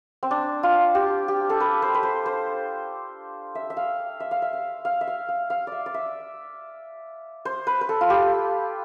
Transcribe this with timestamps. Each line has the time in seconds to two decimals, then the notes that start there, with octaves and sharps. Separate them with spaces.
0.23 C4
0.31 D4
0.63 F4
0.95 G4
1.28 G4
1.50 A4
1.60 B4
1.82 C5
1.94 B4
2.03 C5
2.26 C5
3.55 E5
3.70 E5
3.77 F5
4.20 E5
4.31 F5
4.42 E5
4.53 F5
4.85 F5
5.01 E5
5.07 F5
5.29 F5
5.50 F5
5.67 D5 E5
5.86 D5
5.94 E5
7.45 C5
7.67 B4
7.81 B4
7.89 A4
8.01 F4
8.10 G4